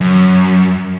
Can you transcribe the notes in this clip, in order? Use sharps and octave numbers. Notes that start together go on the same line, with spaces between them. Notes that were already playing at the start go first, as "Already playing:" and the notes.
F#2